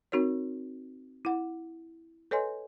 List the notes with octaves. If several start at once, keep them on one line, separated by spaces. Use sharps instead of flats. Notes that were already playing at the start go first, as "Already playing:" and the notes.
C4 D#4 F#4 A#4 C#5
E4 F#5
A4 B4 C#5 D#5 G#5 C6